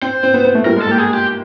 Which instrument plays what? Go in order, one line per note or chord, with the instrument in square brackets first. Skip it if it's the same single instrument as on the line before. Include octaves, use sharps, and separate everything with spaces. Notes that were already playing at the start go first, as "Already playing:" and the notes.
[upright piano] C4 [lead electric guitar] C5
[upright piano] C4
B3
B3
A3
[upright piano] G3 [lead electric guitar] A#4
[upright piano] G#3
[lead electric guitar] A4
[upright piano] A#3 [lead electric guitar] G4
[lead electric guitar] G#4
G4